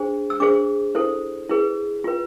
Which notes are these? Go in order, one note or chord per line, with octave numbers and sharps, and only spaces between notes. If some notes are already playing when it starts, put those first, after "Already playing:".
Already playing: D4 G#4 C5
E6
D4 G#4 C5 D6
E4 A4 C5
E4 G#4 B4
F4 B4